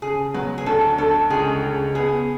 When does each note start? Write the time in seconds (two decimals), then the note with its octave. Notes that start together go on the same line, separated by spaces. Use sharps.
0.02 C#3 G#4
0.34 F#3 B4
0.58 G#4
0.66 D2 A4
0.98 D2 A4
1.30 C#2 G#4
1.63 C#3
1.95 B3 G#4